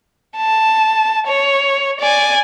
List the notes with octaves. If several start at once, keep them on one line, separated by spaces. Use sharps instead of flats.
A5
C#5
D5 G#5